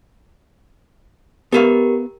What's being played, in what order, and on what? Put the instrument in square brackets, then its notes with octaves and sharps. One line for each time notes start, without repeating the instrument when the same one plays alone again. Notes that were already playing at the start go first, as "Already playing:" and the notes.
[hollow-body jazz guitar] B3 E5 F5 [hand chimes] G4 A#4